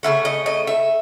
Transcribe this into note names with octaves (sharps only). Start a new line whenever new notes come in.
C#3 E3 A3 E5
D#5
D#5
E5